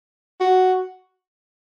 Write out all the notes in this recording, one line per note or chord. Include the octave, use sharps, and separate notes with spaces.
F#4